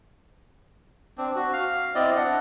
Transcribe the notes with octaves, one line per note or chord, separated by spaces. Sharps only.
C4 D4
F#4
F5
C4 E4 D5 D#5
D4 F#5